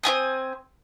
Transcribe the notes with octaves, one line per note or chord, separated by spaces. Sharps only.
C4 E4 G#5 D#6